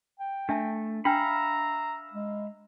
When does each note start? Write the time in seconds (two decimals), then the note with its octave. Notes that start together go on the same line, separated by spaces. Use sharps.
0.20 G5
0.49 A3 D4 E5 A5
1.05 D4 E5 F5 G5 A#5 B5
2.13 G#3